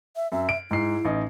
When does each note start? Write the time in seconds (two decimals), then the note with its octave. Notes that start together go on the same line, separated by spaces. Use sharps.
0.16 E5
0.32 F#2 E5
0.49 D7
0.71 G#2 E4 C7
1.05 A1 D#4